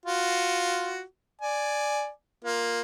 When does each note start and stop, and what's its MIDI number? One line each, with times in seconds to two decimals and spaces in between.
0.06 1.02 65
0.06 1.02 66
1.41 2.08 74
1.41 2.08 80
2.44 2.82 58
2.44 2.82 65